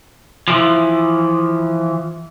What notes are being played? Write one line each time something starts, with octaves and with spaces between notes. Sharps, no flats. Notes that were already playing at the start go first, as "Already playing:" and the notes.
E3 F3